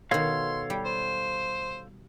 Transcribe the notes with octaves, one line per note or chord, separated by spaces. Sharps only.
B2 D#3 A4 C#5 F5 C6
G3
C5